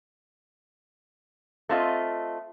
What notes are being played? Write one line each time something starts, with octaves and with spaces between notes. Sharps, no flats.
A3 C4 F4 D#5